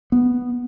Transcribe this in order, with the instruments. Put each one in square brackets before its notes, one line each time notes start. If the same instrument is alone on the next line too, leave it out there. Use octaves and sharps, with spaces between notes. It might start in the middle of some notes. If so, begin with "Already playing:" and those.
[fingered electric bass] B3